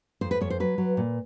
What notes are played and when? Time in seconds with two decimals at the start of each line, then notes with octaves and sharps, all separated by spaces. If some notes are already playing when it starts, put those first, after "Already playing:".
0.21 F2 C5
0.31 B4
0.41 F2 C#5
0.50 C5
0.60 F#3 B4
0.78 F#3
0.97 A#2